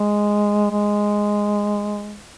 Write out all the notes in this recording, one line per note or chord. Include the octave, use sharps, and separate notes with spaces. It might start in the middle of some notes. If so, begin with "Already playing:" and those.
Already playing: G#3
G#3